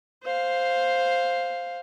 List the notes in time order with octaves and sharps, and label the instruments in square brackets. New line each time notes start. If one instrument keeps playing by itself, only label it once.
[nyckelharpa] C5 F5